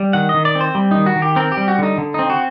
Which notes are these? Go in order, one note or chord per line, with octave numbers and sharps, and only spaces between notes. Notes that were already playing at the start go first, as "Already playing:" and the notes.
Already playing: G3
D#3 F#5
D#5
D#3
D5
C4
C5
G3
D#3 D#4
F#4
D#3
G4
C4 A#4
G4
G3
F#4
D3 D#4
D3
C4 D#4
F#4